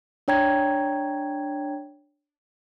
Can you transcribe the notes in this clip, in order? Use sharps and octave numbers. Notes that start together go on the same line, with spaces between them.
D4 C#5 G5 A#5 G#6